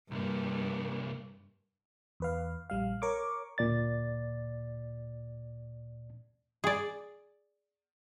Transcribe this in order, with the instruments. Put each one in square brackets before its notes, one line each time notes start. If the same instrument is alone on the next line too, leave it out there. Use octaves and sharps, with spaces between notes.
[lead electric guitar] C2 A#3 [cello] G2
[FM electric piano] E2 B4 F5
A#1 G3 F5
A#4 C#5 C#6 D6
[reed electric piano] D2 A#2 D5 A6
[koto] G#4 D5